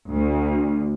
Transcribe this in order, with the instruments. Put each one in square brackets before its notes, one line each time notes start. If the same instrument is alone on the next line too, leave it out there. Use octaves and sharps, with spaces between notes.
[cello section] D2